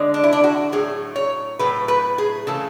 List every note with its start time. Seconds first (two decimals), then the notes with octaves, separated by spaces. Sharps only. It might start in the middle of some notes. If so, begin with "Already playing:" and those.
Already playing: D3 G#3
0.14 D4
0.24 E4
0.33 D4
0.44 F#4
0.72 A2 F#3 A3 G#4
1.16 C#5
1.59 A2 F#3 A3 B4
1.88 B4
2.18 G#4
2.47 C#3 E3 A3 A4